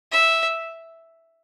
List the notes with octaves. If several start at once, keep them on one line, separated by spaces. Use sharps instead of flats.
E5